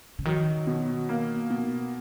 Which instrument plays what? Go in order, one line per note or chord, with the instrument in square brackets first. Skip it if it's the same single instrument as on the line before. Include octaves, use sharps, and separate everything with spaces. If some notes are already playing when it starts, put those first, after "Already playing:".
[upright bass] C#3
[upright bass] D#3 [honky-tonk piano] F#3
[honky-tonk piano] B2
A#3
B2